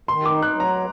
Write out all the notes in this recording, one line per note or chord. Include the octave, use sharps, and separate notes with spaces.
D#3 C6
D6
D#4
F#6
F#3
A#5